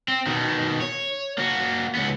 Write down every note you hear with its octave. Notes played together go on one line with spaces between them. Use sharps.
C4
B2 D#3
C#5
A#3 F#4
C#2 B3